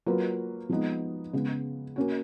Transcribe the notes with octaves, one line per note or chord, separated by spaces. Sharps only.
F#3 A#3 F4 B4
F3 G#3 B3 D#4
C#3 G#3 B3
A#3 C#4 F#4